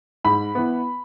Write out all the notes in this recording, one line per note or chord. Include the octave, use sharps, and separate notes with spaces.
G#2 B5
E3 B3